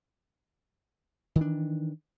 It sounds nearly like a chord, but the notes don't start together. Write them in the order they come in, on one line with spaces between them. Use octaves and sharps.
D#3 E3 D4